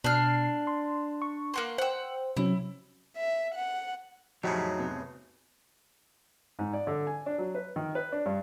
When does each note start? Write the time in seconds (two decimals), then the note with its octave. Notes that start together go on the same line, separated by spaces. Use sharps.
0.04 B2 D4 F6 C7
0.67 C6
1.22 C#6
1.54 A#3 F#5 C6
1.78 C5 F#5 G5 E6
2.37 C3 F#3 C#4 E4
3.16 E5
3.54 F#5
4.44 F2 A2 C#3 F3 F#3 D#4 G4 C#5
4.79 C3 B3
6.59 G#2
6.73 D5
6.87 D3
7.07 G#5
7.26 D4
7.38 F#3
7.55 B4
7.76 D#3
7.95 B4
8.12 D4
8.26 G2